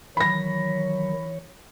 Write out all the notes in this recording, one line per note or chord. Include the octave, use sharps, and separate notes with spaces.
D#3 E3 F#3 C#5 B5 A#6